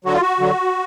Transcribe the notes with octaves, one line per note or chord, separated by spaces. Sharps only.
D3 F#3 F#4
F4
F#4
D3 F#3